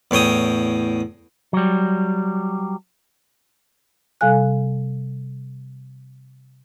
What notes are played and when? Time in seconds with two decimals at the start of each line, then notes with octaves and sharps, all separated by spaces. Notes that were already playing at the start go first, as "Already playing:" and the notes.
0.11 E2 A2 C#5 G5 D#6
1.53 F#3 G3
4.21 C3 G3 A4 F5 G#5 F#6